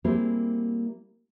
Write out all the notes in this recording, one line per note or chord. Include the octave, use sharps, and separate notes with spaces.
G3 A#3 C4 E4 G4 G#4